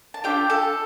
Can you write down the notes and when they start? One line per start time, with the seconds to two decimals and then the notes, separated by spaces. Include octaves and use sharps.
0.14 A5
0.24 D4 F4 G4 A4 G5
0.50 A4 A5